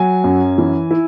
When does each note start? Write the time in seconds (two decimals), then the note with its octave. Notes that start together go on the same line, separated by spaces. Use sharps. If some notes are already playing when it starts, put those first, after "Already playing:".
Already playing: F#3 G#5
0.24 F#2
0.58 E3
0.91 E4